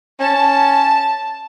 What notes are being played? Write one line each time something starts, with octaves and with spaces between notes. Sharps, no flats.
C#4 A5